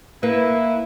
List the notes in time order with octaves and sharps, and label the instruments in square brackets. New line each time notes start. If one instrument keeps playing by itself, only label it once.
[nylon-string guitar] A#3 [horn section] E4 [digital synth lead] B4